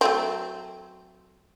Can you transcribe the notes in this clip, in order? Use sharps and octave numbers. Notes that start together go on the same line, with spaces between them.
F#3 A3 C4